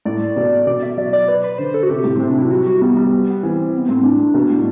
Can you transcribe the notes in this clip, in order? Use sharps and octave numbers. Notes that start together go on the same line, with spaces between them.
A2 D5
B2
B2 D5
E5
F#3 D5
D5
B4
B4
D3 C5
A4
F#4
C3 G4
A2
C3 C4
D4
F#3 E4
G3 F#4
F#4
G3 B3
G3
B3
E3 C4
B3
A2 C4
A2 D4
B2
A2